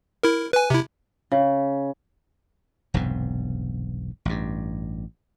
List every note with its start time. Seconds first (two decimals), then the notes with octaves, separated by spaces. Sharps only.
0.23 E4 A#4
0.53 B4 G#5
0.70 C3 E4
1.32 C#3
2.94 E1 B1 G2 C3
4.25 A1 G2